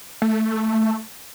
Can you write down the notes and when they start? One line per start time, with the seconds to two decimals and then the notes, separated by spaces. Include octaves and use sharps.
0.22 A3